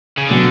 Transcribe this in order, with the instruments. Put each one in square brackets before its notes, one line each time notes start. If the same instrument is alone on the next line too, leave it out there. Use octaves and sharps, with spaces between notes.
[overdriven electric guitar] C#3
[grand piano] B2 F#3 [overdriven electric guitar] D3